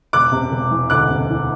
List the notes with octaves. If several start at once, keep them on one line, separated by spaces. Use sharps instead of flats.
E1 D6 F#6
C3
E1
E3
D2 D6 F#6
C3
E3